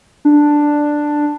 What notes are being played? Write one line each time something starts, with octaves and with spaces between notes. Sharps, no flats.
D4